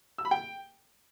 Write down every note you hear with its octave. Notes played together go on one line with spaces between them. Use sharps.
E6
B5
G5